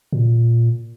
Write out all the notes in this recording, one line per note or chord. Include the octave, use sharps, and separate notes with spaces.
A#2